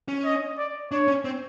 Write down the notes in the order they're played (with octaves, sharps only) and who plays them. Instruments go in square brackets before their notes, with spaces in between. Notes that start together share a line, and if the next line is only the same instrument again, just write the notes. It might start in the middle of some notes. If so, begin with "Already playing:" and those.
[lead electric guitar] C#4
[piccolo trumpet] D#5
D5
[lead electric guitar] D4 [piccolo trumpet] C#5
[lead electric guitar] C#4
C4